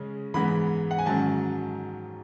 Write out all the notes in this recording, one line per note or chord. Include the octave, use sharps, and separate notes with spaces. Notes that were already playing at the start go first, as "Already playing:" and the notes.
Already playing: C#3 G#3 C#4
G#2 E3 G#3 B3 B5
F#5
G#5
G#2 D#3 F#3 C#4 A5